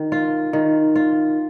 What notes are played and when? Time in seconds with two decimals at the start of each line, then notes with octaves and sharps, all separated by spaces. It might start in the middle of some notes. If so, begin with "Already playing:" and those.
Already playing: D#3
0.12 F4
0.53 D#3
0.96 F4